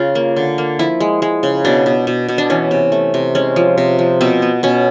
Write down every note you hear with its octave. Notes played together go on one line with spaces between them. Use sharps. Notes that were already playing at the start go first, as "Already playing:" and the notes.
Already playing: C#3 F4
A#3
D3
A#3
F3 E4
G#3
G#3
C#3
B2 D4
B2
B2
B2
D4
E3 C#4
C3
A3
C3
G#3 C#4
F3
C3
F3
B2 C4
B3
B2 C#4